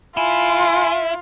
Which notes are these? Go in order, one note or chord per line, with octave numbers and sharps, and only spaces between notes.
E4 F4 G#5 C6